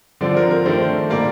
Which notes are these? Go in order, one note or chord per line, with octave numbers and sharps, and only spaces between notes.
D3 F3 C4 D5
A#4
A#4
D#3 A3 D4 C5
A#2 G3 A#3 D5